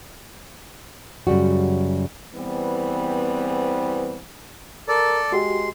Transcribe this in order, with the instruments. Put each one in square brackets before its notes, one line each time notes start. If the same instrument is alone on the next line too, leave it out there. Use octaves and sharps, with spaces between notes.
[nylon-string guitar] F#2 C#3 G3 F#4
[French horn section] E2 E3 G3 B3 C4
[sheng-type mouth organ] A4 D5 [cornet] A#4
[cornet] G#3 [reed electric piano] F#4 G4 [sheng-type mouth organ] C6